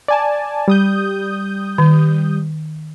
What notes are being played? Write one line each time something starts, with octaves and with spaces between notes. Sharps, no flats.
D5 G#5 A5
G3 D#6 G6
D#3